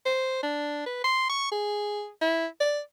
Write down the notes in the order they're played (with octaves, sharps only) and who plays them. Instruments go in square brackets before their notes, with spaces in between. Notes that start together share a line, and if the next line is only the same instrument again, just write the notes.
[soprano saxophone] C5
D4
B4
C6
C#6
G#4
E4
D5